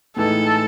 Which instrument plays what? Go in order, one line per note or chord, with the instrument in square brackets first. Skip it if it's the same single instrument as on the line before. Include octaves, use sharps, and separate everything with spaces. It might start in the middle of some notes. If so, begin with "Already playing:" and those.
[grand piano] A2 E3 G#3 D#4 [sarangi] A4